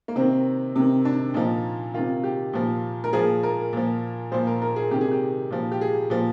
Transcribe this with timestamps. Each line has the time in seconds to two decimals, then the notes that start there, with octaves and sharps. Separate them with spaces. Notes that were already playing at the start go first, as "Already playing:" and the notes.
0.08 A#3
0.16 C3 D#3 C4
0.76 C3 D#3
1.05 D4
1.34 A#2 F3 D#4
1.94 C3 D#3 F4
2.24 G4
2.53 A#2 F3
3.04 A#4
3.13 A#2 F3 G#4
3.43 A#4
3.73 A#2 F3
4.32 A#2 F3 C5
4.47 A#4
4.62 A#4
4.76 G#4
4.91 C3 D#3 G4
5.01 G#4
5.11 G4
5.50 A#2 F3
5.72 G4
5.81 G#4
6.10 A#2 F3